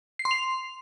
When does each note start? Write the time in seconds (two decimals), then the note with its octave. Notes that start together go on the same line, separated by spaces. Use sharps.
0.19 C7
0.25 C6
0.31 F7